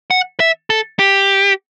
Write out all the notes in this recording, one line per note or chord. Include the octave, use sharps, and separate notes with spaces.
F#5
E5
A4
G4